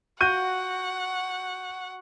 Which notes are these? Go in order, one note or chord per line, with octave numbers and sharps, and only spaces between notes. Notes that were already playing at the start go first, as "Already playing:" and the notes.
F#4 F#5 C#6 F#6 G6 D#7